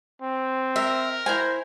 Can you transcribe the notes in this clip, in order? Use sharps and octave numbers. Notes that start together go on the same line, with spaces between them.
C4
A#4 E5
E4 C5 G#5